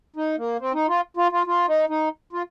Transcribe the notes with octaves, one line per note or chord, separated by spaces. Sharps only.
D#4
A#3
C4
D#4
F4
F4
F4
F4
D#4
D#4
F4